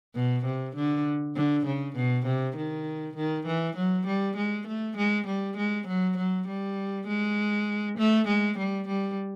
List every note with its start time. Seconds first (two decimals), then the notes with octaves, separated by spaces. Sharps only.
0.15 B2
0.46 C3
0.76 D3
1.36 D3
1.66 C#3
1.96 B2
2.26 C3
2.57 D#3
3.16 D#3
3.46 E3
3.77 F#3
4.07 G3
4.37 G#3
4.67 A3
4.97 G#3
5.27 G3
5.57 G#3
5.88 F#3
6.17 F#3
6.48 G3
7.07 G#3
7.98 A3
8.28 G#3
8.58 G3
8.88 G3